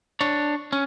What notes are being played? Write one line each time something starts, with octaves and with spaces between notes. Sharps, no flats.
D4 C#5
C#4